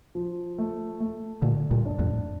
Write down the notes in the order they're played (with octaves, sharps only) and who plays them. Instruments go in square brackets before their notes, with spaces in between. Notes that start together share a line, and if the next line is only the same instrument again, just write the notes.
[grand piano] F3
A3
A3
[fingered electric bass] A#2 D3 [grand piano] A3
[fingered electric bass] G2 A#2
[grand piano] D4
[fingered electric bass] F2 A2